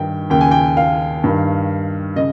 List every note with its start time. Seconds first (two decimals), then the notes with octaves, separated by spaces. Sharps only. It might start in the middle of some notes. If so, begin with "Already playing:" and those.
Already playing: G2 D#3 G5
0.30 D#2 C#3 G5
0.41 G#5
0.51 G5
0.77 F5
1.24 G2 D#3
2.16 C#3 D#5